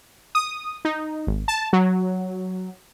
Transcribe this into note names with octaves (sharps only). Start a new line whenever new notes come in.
D#6
D#4
G#1
A5
F#3